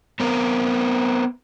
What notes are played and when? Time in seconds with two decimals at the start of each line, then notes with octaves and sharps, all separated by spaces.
0.20 B3 C4 A#4